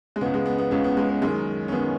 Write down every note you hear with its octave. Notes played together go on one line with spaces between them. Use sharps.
G#3
C#2 C#3 B3
G#3
B3
B3
C#2 C#3 C#4
B3
G#3
B3
F#1 F#2 D#3 G#3
C#4
F#2 D#3 B3